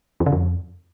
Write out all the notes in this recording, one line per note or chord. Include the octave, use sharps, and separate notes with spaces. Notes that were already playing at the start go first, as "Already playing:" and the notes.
E2
C#3
F2